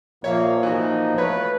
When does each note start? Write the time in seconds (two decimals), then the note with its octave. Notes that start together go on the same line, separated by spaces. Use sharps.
0.24 A#2 F3 A#3 C#5 E5 F5
0.63 E3 D#4 F#4
1.18 A3 B4 C#5 F5